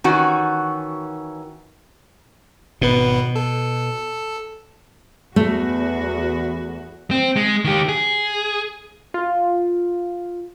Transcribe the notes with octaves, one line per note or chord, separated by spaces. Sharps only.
D#3 E3 C#4 F#4
G#1 B2 B3 B4
A4
E2 A3 F#4
C4
G#3
D#3 G4
G#4
F4